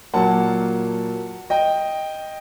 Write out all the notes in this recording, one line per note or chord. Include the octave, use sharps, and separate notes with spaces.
A#2 F#3 A#3 F#5 A5
D#5 G5